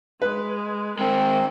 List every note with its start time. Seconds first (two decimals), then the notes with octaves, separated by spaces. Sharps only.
0.22 G#3 B4
0.99 D#3 G#3 C4 A#4